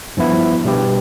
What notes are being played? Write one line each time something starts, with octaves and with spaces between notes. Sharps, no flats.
G2 F3 B3 E4
B2 G3 D4 G4 B4